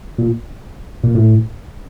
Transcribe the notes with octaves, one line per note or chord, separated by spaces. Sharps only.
A#2
A#2
A2